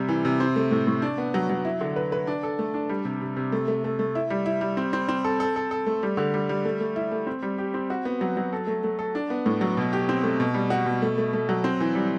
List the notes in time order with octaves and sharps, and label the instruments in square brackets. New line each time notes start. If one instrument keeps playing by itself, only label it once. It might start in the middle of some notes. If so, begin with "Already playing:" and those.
Already playing: [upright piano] C3 G3
E3
C3
C4
A3
A2
A2
D4
B3
F#3
F#3
E4
D3
B4
B4
D4
A4
A3
D4
G3
C3
C3
C3
A3
A3
A3
A3
E4
G3
E4
G3
C4
C4
C4
A4
A4
A4
A4
A3
G3
D3
G3
G3
A3
A3
E4
A3
C4
G3
G4
C4
F#4
B3
F#3
F#3
A4
A3
A3
A4
D4
B3
A2
F#3
B2
G4
C4
A3
B2
G3
F#4
B2
A3
A3
A3
F#3
C4
E3
G3